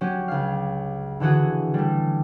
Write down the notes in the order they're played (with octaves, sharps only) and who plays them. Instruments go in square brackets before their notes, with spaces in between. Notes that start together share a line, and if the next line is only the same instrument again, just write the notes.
[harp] F#3 C#4 G4
C#2 F5
D3 E3 C#4 F#4 G#4
G3 A3